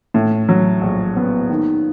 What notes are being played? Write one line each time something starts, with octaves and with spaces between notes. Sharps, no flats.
A2
F#3
A#1
B3
D#3